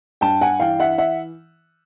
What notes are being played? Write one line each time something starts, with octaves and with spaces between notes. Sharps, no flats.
G2 G5 A5
F#5 G#5
E3 F5 G5
E5 F#5
E5 F#5